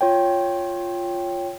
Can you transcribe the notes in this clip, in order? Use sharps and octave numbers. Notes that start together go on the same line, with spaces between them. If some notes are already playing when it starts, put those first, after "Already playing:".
F4 C#5 G5